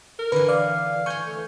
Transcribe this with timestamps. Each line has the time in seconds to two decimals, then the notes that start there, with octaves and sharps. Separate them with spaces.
0.19 A#4
0.32 D3 E3 B4
0.48 D5 F5
1.06 C#5 G#5 C#6 G6
1.27 A3